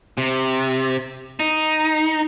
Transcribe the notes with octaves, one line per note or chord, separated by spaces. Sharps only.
C3
D#4